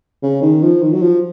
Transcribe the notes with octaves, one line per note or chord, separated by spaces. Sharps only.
C#3
D#3
F3
D#3
F#3
F3